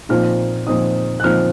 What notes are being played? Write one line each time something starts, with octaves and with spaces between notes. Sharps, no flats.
A#2 F3 C4 D#4 F6
A#2 F3 C4 D#4 D#6
F#6
A#2 F3 C4 D#4 F6